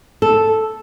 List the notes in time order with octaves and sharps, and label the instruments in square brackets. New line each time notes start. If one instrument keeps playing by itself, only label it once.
[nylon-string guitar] A4